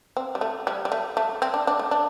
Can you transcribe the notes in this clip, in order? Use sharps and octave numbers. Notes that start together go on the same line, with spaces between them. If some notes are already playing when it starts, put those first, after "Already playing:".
C4
G3
A3
G3
G3
A3
A3
C4
D4
D4
A3
D4